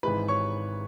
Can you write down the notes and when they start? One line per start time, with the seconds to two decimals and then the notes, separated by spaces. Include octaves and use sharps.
0.03 G#1 G#2 E3 G#3 B4 B5
0.28 C#5 C#6